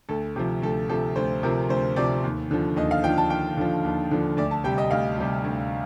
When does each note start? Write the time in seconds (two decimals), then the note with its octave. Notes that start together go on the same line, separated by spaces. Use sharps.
0.09 D2 A4
0.36 C3 F3
0.62 D2 A4
0.89 C3 F3 A4
1.16 D2 C5
1.43 C3 F3 A#4
1.69 D2 C5
1.96 C3 F3 D5
2.23 D#2
2.51 D3 F3
2.76 D#2 D#5
2.91 F5
3.04 F3 G5
3.07 D3
3.18 A5
3.30 D#2 G5
3.57 D3 F3
3.84 D#2
4.11 D3 F3
4.37 D2 D5
4.51 A5
4.64 C3 G3 G5
4.78 D#5
4.91 D2 F5
5.18 C3 G3
5.45 D2